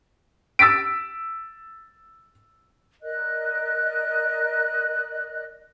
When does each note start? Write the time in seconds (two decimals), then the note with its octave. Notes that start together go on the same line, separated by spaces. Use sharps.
0.59 E6 A6 B6 D7
3.03 A#4 D5 D#5 F#6